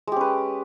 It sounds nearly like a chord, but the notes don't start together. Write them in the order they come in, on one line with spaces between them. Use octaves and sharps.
G#3 G4 C#4 B4